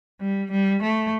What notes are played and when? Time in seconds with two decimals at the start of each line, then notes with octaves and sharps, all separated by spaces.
0.21 G3
0.51 G3
0.83 A3